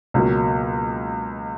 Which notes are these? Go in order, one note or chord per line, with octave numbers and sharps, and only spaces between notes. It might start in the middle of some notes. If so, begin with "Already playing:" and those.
C#2 B2 F#3 A#3